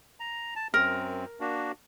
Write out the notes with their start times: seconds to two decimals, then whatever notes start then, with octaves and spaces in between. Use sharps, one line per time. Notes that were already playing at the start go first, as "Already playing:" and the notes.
0.20 A#5
0.56 A5
0.74 F#2 C4 A#4
1.40 A#3 D4 F#4